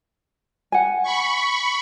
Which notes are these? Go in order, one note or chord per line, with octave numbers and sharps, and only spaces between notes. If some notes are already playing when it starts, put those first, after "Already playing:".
F#5 G#5
B5 C#6